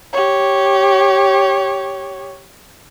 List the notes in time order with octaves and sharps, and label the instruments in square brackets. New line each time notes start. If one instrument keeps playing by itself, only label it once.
[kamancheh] G4 C#5